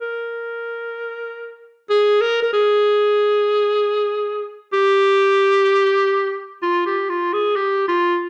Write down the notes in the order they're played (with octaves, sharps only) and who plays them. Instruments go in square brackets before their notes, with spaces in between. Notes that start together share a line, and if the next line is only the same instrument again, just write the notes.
[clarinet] A#4
G#4
A#4
A#4
G#4
G4
F4
G4
F4
G#4
G4
F4